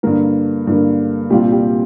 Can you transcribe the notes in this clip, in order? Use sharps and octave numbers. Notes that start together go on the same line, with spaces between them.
G2 D3 A#3 A#4
G2 D3 A#3
C2 A#2 G3 C4 F4 G4
G4